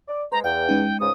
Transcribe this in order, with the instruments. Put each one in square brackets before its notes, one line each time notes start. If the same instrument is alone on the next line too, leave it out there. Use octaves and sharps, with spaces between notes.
[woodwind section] D5
[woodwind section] G#3 C5 [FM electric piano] B4 [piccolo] A#5
[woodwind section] E2 [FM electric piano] D5 F5 [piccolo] G5
[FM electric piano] G#3 C#4 D#4
[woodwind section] C#2 G#2 C#3 [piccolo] D#6